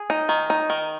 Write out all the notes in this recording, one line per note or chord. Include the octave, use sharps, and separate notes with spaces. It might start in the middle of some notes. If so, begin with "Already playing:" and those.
Already playing: G#4
D#4
D#3
D#4
D#3